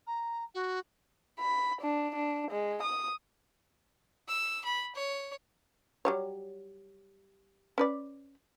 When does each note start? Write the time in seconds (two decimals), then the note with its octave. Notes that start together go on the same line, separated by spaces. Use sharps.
0.06 A#5
0.54 F#4
1.40 B5
1.81 D4
2.15 D4
2.51 G#3
2.83 D#6
4.28 E6
4.65 B5
4.95 C#5
6.05 F#3 G3 C#5
7.78 C#4 B4 D5